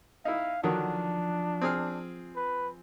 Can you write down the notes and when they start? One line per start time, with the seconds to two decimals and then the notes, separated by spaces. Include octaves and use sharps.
0.25 D#4 E4 F5
0.63 D3 D#3 F3 F#3 D4
1.61 C4 G#4 F6
2.36 B4